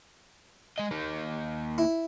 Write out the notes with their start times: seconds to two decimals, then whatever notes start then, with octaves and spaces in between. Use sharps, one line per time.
0.78 G#3 D#5
0.91 A#3 D#4
1.78 E4